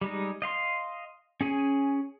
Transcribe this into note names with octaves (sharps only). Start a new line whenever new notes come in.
G3 G#3 D#4
D#5 F5 C6
C#4 G#4 G#5